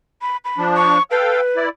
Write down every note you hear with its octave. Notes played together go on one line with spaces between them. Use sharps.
B5
B5
F3 D4
C#6
A4 B4 F5 G5
E4 D5